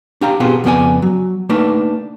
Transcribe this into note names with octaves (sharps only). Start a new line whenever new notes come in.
D4 G4 F5 A#5
B2 B3 C4 F4 G4 G#4
F2 C#3 B3 G4 D5 G#5
F#3
A3 A#3 D4 D#4 B4